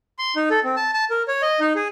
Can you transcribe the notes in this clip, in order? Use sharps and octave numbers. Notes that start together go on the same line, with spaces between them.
C6
D#4
A4
C4
A5
A5
A#4
C#5
D#5
D#4
G#4